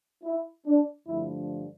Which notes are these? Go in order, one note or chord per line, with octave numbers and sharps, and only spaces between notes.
E4
D4
G2 D3 F3 A3 E4